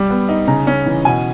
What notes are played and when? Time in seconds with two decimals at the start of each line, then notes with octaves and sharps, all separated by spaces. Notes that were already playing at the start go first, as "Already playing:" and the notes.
Already playing: G3
0.10 B3
0.29 D#4
0.48 C#3 A#5
0.67 C#4
0.86 E3
1.05 B2 G#5